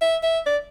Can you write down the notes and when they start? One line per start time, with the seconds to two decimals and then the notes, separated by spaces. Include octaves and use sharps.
0.01 E5
0.23 E5
0.46 D5